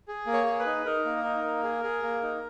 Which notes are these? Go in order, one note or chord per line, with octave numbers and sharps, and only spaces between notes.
G#4
A#3
C#5
G#4
B4
D#4
D#4 A#4
A#3
D#4
A#3
G#4
G#4
A#3
D#4